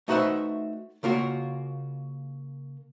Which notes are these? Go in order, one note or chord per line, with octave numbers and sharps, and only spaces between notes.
A3 D#4 F#4 B4 C5 E5
C#3 A#3 F4 F#4